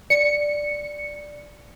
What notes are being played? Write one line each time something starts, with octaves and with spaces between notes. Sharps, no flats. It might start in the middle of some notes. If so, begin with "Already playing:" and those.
D5 C#7